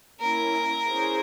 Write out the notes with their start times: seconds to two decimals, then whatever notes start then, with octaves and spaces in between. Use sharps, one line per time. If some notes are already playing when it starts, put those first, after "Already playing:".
0.20 A#3 C#4 E4 A#4
0.87 C#4 E4 G#4 C5